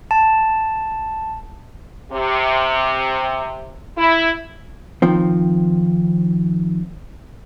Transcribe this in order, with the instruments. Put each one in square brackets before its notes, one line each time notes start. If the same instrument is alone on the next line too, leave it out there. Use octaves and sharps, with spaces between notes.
[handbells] A5
[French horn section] C3
E4
[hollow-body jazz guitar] D#3 F3 C4